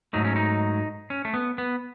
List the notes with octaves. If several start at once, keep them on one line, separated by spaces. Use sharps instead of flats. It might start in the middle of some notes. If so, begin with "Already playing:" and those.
G#2 F#3 A3 D#4
C#4
D#4
C#4
A3
B3
B3